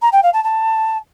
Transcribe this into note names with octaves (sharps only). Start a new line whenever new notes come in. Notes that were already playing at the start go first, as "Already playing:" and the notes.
A#5
G5
F5
A5
A5